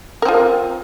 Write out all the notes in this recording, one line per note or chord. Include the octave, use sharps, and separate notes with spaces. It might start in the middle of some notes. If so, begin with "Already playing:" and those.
C4 F4 A#4